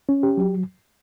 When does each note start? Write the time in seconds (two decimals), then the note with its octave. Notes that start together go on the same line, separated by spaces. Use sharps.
0.09 C#4
0.23 G4
0.37 F#3